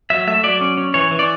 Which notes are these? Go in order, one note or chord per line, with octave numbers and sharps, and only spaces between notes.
F#3 E5
A3 E5
F#3 D5
C#4
C#4
E3 C#5
E3
D5